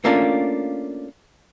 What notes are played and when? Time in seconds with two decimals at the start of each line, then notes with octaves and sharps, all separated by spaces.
0.04 A3 A#3 C#4 D4 F4